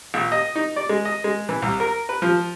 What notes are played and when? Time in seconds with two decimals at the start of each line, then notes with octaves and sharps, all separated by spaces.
0.14 A#1
0.32 D#5
0.56 D#4
0.76 D5
0.89 G#3
1.05 D#5
1.24 G#3
1.49 E3
1.62 C2
1.80 A#4
2.09 B4
2.22 F3